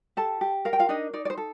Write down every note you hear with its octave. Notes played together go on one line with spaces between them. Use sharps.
G4 A4 A5
G4
A#4 F5
G5
F4 F5
D4 D#4 D#5
D#4 D5
D5
C5
A4